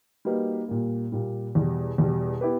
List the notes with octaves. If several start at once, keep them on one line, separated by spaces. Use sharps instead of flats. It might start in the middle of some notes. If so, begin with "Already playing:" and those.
G3 A#3 D#4 F#4 B4
A#2 G3 A#3
A#2 G3 A#3
E2 B2 G3
E2 B2 G3
B3 E4 G4 B4